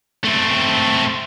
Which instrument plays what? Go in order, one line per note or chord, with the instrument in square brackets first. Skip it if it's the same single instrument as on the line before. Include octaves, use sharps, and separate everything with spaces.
[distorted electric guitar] A3 C4